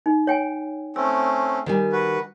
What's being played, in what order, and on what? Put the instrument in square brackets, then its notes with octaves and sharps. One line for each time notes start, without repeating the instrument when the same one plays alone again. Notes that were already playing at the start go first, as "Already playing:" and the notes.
[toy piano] D#4
C#5 G5 G#5
[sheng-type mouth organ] A3 C4 C#4 [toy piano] E6
[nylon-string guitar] D#3 G3 G#5
[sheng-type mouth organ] F#4 B4